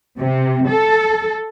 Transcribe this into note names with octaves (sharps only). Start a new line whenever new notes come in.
C3
A4